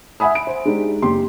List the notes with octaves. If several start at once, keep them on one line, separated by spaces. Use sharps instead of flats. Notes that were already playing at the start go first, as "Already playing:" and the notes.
E5 F#5 G#5 B5 D#6
D7
C5
G#3 D4 D#4 G4
F#1 G4 C6